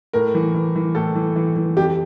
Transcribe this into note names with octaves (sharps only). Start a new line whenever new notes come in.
A2 A#4
E3
E3
E3
A2 A4
E3
E3
E3
F2 G4